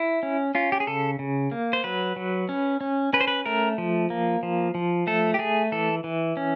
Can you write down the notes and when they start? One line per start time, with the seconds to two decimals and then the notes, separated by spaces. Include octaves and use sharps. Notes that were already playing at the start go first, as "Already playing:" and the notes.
Already playing: E4
0.23 C#4
0.55 C#4 F4
0.72 G4
0.80 G#4
0.87 C#3 A4
1.19 C#3
1.51 A#3
1.73 C5
1.84 F#3 B4
2.16 F#3
2.49 C#4
2.81 C#4
3.13 C#4 B4
3.21 C5
3.28 B4
3.46 A3 A#4
3.78 F3
4.10 A#3
4.43 F3
4.75 F3
5.07 A3 A4
5.34 G4
5.39 A3 G#4
5.72 E3 A4
6.04 E3
6.37 C#4